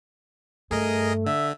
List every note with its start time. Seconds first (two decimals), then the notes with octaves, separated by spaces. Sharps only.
0.71 G2 A3 G#4 A#4 D#5
1.26 D3 E5